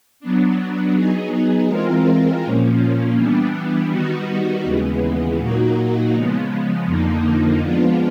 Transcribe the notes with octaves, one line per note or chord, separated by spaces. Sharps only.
F#3 B3 D4
F#3 B3 D#4 G#4
E3 G#3 C4 F4 A#4
A#2 F3 A#3 C#4
E3 G3 B3 D4
D#3 G3 B3 D#4 F#4
D#2 C#3 E3 G#3 B3
A#2 F#3 A#3 D#4 F#4
C#3 F3 G#3 B3
F2 D3 F3 A#3 D#4
F3 G#3 B3 D4 F4